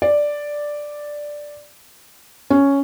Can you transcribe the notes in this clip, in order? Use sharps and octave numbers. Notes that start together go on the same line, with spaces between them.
D5
C#4